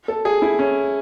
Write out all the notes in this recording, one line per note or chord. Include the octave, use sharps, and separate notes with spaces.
A4
G#4
E4
C#4